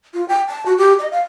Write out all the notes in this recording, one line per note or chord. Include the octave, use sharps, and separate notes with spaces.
F4
G5
A5
F#4
G4
D#5
F5